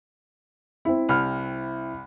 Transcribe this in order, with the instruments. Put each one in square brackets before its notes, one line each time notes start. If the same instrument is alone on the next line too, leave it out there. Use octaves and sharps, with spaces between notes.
[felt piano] C4 E4
[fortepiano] C2 F6